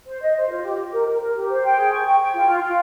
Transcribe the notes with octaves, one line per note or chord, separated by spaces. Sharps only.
C5
D#5
C5
F4
G4
G4
A#4
A#4
A#4
G4
C5
G5
G#4
C#6
G5
G5
F4
F4
F4